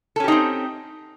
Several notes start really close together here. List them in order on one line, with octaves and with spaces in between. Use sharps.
A4 C#4 G4 D#4 C4